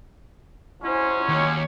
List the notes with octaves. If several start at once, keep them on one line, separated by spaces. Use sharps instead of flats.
F#3 G#3 C#4 E4 C5
D#2 C#5